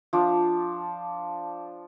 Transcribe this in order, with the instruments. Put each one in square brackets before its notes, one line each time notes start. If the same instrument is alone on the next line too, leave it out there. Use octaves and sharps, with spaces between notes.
[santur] F3 D4